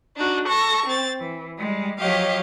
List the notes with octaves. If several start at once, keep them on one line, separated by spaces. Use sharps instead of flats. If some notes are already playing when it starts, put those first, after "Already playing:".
D4 D#4 F#4
A4 C#6 A#6
C4 A6
E3
G3 G#3
F3 F#3 G4 C#5 D#5 F5